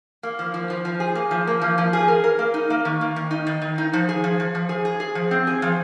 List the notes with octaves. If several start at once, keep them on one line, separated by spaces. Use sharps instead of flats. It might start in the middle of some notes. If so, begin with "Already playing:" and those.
A#3
F3
F3
F3
F3
G#4
A#3
F3
A#3
F3
F3
G#4
A#4
A#4
A#3
D#4
A#3
D#3
A#3
D#3
D#4
D#3
D#3
D#4
F3
G#4
F3
F3
F3
G#4
G#4
G#4
F3
C4
G#4
F3